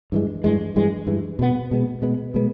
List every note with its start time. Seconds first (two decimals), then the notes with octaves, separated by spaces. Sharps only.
0.12 G2 E3 G#3
0.44 G2 E3 G#3
0.76 G2 E3 G#3
1.07 G2 E3 G#3
1.39 B2 G#3 B3
1.71 B2 G#3 B3
2.02 B2 G#3 B3
2.34 B2 G#3 B3